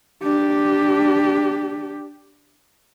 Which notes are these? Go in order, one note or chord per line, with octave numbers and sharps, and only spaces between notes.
D4 G4